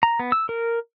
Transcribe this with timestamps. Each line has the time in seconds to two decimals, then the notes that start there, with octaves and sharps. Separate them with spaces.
0.03 A#5
0.19 B3
0.32 E6
0.49 A#4